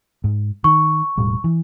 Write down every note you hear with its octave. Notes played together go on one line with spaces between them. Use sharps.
G#2
D#3 C#6
E1 A2 G3
E3